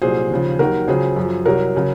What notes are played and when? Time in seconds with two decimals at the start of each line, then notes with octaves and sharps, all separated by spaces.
0.02 C2 A#2 F#3 G#4 C5
0.31 D#2 C#3 F3
0.59 D#2 D#3 F#3 F#4 A#4
0.88 C#2 C#3 F#3 G#4 C5
1.16 F#2 F3
1.46 C2 C3 F#3 A#4 C#5
1.76 C#3 F#3